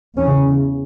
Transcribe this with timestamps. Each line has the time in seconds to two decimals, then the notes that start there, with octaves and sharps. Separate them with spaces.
0.18 E2 C#3 C#4